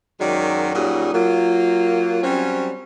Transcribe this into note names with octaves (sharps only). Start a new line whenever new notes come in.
F#2 D#3 F#3 G#3 D5
A#2 F#3 G3 C#4 D#4 G#4
F#3 A#3 F4
F#3 G3 C4 C#4